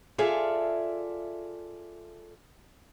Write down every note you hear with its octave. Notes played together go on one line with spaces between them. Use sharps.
F4 G#4 A4 D5 E5 F5